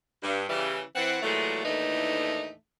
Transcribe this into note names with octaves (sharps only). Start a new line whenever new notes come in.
G2
C#3 E3 G3
E3 C4 F#5
A#2 E3 F#3 G#3 A3
D#2 A2 E3 A3 D4 D#4